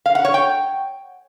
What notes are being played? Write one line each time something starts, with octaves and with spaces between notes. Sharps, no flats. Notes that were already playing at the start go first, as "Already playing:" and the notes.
F5
F#5
C#5
G5